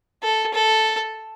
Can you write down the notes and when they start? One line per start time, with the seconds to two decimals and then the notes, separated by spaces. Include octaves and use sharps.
0.23 A4
0.54 A4